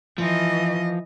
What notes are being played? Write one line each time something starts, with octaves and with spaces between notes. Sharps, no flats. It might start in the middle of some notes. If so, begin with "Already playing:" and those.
E3 F3 D#5